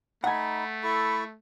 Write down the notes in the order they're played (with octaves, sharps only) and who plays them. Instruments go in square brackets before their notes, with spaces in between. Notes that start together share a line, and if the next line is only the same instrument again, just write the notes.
[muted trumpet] A3 [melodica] D#4 [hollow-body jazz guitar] F#5 G#5 [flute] B5
[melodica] E4 A4 C#6 [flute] B5